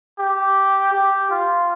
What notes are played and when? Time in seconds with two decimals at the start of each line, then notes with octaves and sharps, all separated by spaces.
0.19 G4
0.93 G4
1.31 F4